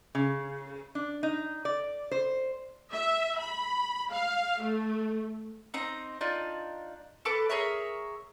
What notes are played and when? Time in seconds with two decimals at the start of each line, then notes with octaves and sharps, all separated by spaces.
0.15 C#3
0.95 D4
1.23 D#4
1.65 D5
2.11 C5
2.93 E5
3.39 B5
4.11 F5
4.60 A3
5.74 C4 D#4 A#5
6.21 D4 D#4 F4
7.25 A4 B4 A5 D6
7.49 G#4 A#4 C#5 E5